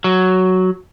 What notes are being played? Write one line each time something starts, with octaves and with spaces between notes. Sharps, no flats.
F#3